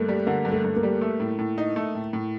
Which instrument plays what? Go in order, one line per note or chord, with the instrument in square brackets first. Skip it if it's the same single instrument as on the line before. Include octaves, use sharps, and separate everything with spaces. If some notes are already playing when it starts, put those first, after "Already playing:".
Already playing: [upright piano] G2 [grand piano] A3 A#3
[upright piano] G3
[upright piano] D3 [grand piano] A#3
[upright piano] G2
[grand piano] A3
[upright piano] G2
[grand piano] A#3
[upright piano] G3
A3
A2
A2
D#4
A3
A2
A2